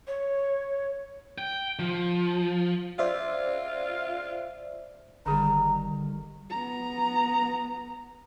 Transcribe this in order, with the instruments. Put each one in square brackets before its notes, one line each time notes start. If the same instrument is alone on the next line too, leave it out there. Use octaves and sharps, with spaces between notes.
[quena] C#5
[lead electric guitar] G5
F3
[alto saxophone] F4 [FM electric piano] C5 D5 E5
[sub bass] G1 [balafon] D3 G#4 [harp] D#3 G3 [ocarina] A#5
[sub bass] D3
[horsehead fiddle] B3 A#5